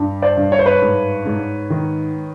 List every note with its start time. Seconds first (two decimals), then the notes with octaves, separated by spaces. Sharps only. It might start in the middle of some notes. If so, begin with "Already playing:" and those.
Already playing: G2 G3
0.22 C5 D5
0.37 G2
0.52 C#5
0.59 C5
0.66 B4 C#5
0.82 G#2
1.26 G#2
1.70 D#3